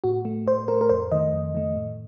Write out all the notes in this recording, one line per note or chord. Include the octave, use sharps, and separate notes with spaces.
A2 F#4
A3
A2 C5
A3 A#4
A#4
F2 C5
D#3 A3 D#5
F2
D#3 A3
A2